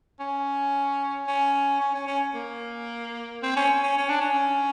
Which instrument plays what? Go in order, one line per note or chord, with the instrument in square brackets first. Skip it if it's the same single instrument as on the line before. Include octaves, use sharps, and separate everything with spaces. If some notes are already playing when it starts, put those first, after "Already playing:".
[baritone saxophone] C#4
C#4
C#4
C#4
C#4
A#3
C4
C#4
C#4
C#4
D4
C#4